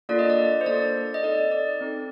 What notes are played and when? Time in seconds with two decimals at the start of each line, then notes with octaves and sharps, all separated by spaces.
0.09 A#3 D4 F4 A4 D5
0.19 D#5
0.30 D5
0.61 C5
0.66 A#3 D4 F4 A4 D5
1.14 D#5
1.23 C4 D#4 A4 D5
1.52 D5
1.81 C4 D#4 A4